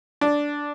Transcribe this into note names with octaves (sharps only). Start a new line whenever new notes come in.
D4